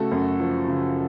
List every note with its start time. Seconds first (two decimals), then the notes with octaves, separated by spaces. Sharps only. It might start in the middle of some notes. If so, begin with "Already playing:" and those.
Already playing: C#3 A3 F#4 A4
0.12 F#2
0.40 F3
0.68 C#3